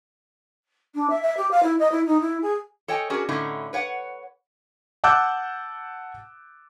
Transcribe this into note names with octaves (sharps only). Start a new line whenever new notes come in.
D4
E5
E5
G4
F5
E4
D#5
E4
D#4
E4
G#4
A4 C#5 D#5 G5 G#5
C#4 D4 F#4 G#4 A#4
A2 D3 C#4 D#4 E4
B4 C#5 F5 F#5
F#5 A5 D6 E6 F#6 G6